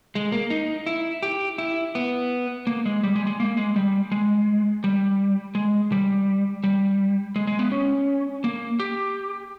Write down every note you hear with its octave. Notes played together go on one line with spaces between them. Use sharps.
G#3
A#3
D#4
E4
G4
E4
B3
A#3
G#3
G3
G#3
G3
G#3
A#3
G#3
G3
G#3
G3
G#3
G3
G3
G#3
G#3
B3
C#4
A#3
G4